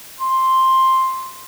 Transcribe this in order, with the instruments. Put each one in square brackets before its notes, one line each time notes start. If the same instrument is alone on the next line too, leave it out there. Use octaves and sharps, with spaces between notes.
[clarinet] C6